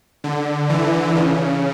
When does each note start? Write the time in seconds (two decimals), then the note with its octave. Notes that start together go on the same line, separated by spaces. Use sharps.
0.24 D3
0.70 E3
1.16 C#3